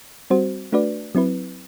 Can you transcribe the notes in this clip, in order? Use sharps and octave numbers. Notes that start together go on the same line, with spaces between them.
G3 C4 F#4 C5
A3 D4 F#4 B4 D5
F#3 C4 E4 B4